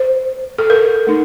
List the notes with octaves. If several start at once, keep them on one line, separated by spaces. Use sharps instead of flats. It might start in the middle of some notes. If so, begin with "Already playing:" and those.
Already playing: C5
A4
A#4
A3 D#4